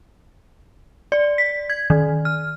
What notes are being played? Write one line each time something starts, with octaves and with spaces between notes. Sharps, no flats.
D5
B6
G#6
D#3
F6